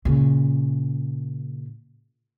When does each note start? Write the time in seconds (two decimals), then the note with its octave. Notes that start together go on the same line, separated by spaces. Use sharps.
0.05 A#2 C#3